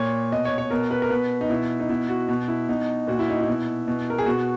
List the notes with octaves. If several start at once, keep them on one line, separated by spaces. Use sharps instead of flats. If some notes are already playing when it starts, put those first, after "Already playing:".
Already playing: A#2 C#5
B2 D#5
C#5
C#5
B2 A#4
B4
A#4
B2 B4
D#4
B2 E4
D#4
B2 E4
F#4
B2
E4
B2 D#4
A#2 F#4
E4
D#4
E4
B2
B2
A#4
G#4
B2 F#4